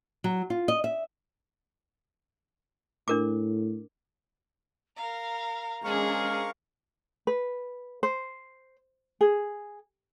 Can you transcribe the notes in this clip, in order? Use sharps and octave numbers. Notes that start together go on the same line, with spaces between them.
F#3
F4
D#5
E5
A2 D4 A#4 D6
A#4 F5 A#5
G#3 C#4 D4 G#4 A#4 C5 F5 C#6
B4
C5
G#4